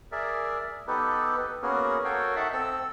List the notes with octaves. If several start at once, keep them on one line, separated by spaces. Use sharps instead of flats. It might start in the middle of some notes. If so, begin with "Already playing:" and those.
G#4 A#4 D5 E5
B3 D#4 G4 A4 B4
A#3 B3 C#4 F#4 G#4 A#4
F#4 A4 A#4 C#5 F5 G5
D#4 A4 E5 F#5 A5
C4 A4 E6